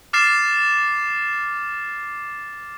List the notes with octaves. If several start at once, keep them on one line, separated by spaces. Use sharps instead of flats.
D6 F6 A6 C7 E7